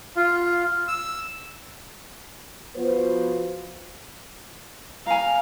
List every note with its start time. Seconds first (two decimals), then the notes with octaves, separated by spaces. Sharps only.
0.16 F4
0.88 E6
2.76 F3 B3 F4 F#4 B4 C5
5.06 F5 G#5 A#5